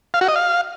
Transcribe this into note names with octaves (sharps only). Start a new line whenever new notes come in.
F5
F#4
D#5
F5